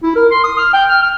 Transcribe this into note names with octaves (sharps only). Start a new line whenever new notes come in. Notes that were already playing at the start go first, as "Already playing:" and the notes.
E4
A#4
C6
D#6
F6
G5
F6
F6